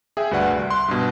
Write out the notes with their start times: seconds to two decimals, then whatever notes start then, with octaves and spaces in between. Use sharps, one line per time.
0.17 G#4 E5 G5
0.31 D2 G2 F#4 B4 D5 F#5
0.48 C2
0.70 C6 F#6
0.88 G2 B2